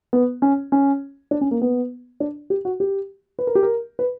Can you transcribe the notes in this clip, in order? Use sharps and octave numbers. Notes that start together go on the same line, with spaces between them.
B3
C#4
C#4
D4
C#4
A#3
B3
D4
G4
F#4
G4
B4
A#4
G4
A#4
B4